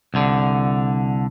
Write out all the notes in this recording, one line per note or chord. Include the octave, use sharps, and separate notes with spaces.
C2 D3